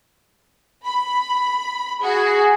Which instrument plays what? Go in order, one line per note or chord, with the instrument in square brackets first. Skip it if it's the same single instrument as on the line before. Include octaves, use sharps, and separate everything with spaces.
[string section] B5
[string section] F#4 [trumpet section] G#4